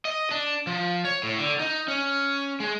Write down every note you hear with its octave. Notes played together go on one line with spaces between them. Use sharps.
D#5
D4
F3
C#5
A2
D3
D#4
C#4
G#3